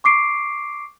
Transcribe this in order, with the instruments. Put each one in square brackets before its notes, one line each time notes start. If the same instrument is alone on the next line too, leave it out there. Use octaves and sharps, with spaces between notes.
[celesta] C#6 D6 C7 D7